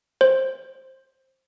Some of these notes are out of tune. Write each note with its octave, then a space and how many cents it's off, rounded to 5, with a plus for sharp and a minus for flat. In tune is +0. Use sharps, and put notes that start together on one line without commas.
C5 +10